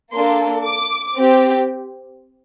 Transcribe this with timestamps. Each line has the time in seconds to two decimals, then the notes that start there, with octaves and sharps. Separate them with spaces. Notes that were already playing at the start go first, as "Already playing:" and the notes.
0.13 A#3 D4 A4 C6
0.64 D6
1.16 C4 G4